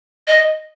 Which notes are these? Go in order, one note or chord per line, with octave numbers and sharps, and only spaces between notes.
D#5